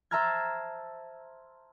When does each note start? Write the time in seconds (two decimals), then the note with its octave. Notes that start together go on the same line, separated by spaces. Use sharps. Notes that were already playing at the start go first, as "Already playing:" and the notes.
0.11 C5 E5 A5 A#5 F6 G#6